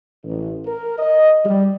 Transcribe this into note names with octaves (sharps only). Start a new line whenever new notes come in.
A1
A#4
D#5
G3